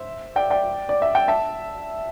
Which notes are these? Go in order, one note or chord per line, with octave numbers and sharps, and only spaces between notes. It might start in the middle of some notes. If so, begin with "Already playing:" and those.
Already playing: C5 E5
D5 G5
D5 G5
D5
E5
G5
E5 A5